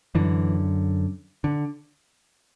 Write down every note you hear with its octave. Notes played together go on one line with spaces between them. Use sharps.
F#2 D3 E3
D3